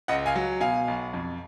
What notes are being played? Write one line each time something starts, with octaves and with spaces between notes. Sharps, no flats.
C#2 D#5 F#5
F5 G#5
F#3
B2 F5 G#5
B1
F2